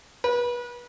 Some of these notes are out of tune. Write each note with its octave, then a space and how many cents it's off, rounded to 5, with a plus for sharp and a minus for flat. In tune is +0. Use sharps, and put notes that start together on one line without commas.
B4 -30